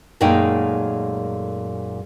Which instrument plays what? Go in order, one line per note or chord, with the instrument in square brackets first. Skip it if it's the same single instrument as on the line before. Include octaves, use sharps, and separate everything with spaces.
[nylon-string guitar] F#2 A#2 G#3 A3 D#4 G5